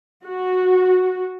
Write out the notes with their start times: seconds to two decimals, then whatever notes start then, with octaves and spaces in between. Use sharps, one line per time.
0.25 F#4